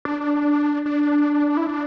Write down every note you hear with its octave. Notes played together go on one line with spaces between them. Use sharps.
D4
D4
E4
D4